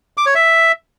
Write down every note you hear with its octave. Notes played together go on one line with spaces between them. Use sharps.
D6
C#5
E5